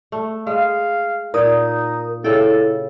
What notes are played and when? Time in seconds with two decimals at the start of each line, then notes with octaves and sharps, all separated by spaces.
0.12 A3
0.47 G#3 F5
1.34 A#2 D#4 A#4 D#6
2.24 C#3 E4 A4 G5